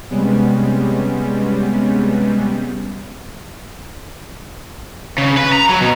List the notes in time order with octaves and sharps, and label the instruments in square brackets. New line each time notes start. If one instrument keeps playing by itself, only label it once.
[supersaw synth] C3 G3 G#3 B3 C#4
[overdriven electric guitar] C#3
B4
A#5
F#3
B2